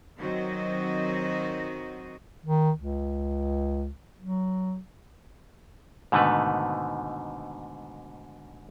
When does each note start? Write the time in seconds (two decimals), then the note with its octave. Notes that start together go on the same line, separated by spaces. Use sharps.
0.20 D#3 F#3 C4 F#4 D#5
2.46 D#3
2.78 C#2
4.20 F#3
6.12 G#2 B2 D3 D#3 A3 B4